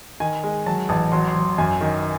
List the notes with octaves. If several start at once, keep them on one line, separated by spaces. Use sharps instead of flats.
D#3 G#5
G#3
F#3 A5
A1 A5
F#3 C6
C6
F#3
F#2 G#5
D#3